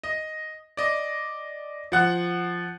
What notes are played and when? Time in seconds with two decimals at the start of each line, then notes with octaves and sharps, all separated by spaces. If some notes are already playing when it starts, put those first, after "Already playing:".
0.03 D#5
0.77 D5 D#5
1.92 F3 F#5 F#6